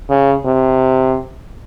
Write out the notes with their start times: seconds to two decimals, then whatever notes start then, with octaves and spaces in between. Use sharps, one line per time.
0.10 C#3
0.46 C3